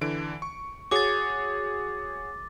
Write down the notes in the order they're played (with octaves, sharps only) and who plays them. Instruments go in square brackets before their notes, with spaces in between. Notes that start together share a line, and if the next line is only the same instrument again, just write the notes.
[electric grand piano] D3 E3 D7
C#6
[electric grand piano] F#4 G#4 C#5 [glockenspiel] D6 A6